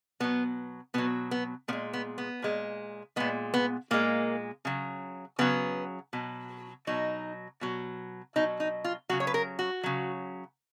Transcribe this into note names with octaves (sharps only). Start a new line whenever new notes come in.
B2 F#3 B3
B2 F#3 B3
B3
A#2 G#3 B3
B3
B3
A#2 G#3
A#2 G#3 B3
B3
A#2 G#3 A#3
C#3 F#3
C#3 F#3 B3
B2 F#3
B2 F#3 D#4
B2 F#3
B2 F#3 D#4
D#4
F4
C#3 F#3 F#4
C#5
B4
A#4
F#4
C#3 F#3